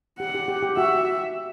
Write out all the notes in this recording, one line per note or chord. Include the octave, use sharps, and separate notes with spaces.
G4 F#5
G4
G4
G4
F#4 E5